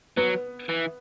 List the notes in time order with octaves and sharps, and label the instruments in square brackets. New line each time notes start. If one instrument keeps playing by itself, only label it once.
[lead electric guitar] F#3 [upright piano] B3
[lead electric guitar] E3